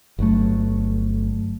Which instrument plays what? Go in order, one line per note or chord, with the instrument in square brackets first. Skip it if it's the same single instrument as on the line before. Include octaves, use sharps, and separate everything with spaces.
[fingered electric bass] G1 F#3 A3